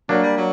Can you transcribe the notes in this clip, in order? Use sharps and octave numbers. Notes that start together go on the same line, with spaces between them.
F#3 A#3 D4
G3
F#3